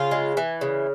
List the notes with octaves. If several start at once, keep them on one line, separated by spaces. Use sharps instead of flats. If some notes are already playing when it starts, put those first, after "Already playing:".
Already playing: C#3 F4
G#3
E3
C#3